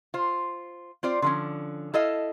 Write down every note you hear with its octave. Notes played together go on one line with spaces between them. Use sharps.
F4 C5
C4 F4 C5 D5
D3 F3 C#4
E4 A4 D#5 F5